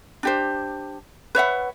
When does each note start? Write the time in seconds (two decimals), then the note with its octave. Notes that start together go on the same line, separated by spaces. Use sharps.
0.23 D4 G4 C5
1.35 B4 C#5 E5 F#5